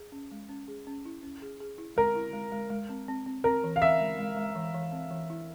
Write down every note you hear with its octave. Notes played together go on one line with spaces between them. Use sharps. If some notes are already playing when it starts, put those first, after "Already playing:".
Already playing: G#4
C#4
G#3
C#4
G#4
C#4
E4
C#4
G#4
G#4
E4
G#3 A#4
E4
G#3
G#3
G#3
C4
C4
C4
C4 A#4
E3
F5
E3 E5
G#3
G#3
G#3
E3
E3
C4
E3
E4